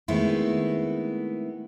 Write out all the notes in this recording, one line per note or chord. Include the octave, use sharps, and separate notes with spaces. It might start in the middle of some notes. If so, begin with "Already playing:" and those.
D#3 G#3 A3 B3 C4 E4